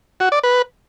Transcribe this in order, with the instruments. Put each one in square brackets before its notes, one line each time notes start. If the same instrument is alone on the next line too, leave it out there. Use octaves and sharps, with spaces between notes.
[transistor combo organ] F#4
D5
B4